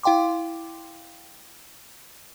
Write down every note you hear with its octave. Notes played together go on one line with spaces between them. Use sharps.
E4 F5 G5 C6 D6